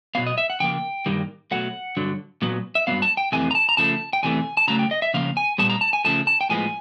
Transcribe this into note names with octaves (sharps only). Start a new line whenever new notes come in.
B2 F#3 B3 F5
D#5
E5
F#5
C#3 F3 A#3 G5
G2 D#3 G3 A#3
B2 F#3 A3 F#5
G2 D3 F#3
A#2 F#3 B3
E5
G2 D#3 F#3 B3 F5
A5
G5
F2 C3 E3 A3 G#5
A#5
A5
A#5
C#3 F3 A3 A5
G5
E2 C3 E3 A3 G#5
A5
C#3 F#3 A3 A#5
G5
D#5
E5
C#3 F3 A#3 F5
G#5
A#2 G3 B3 A5
A#5
A5
G#5
C#3 F3 A3 A5
A5
G5
A2 F3 G#3 B3 G#5